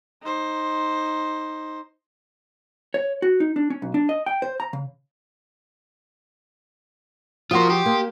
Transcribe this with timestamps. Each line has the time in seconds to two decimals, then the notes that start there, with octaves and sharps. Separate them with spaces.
0.22 D#4 C5
2.94 C#5
3.22 F#4
3.40 D#4
3.56 D4
3.70 C#4
3.82 B1
3.94 D4
4.09 D#5
4.26 G5
4.42 C5
4.60 A#5
4.73 C#3
7.51 F3 F4 F#4 A#4 C6 D#6
7.70 G4
7.86 A#3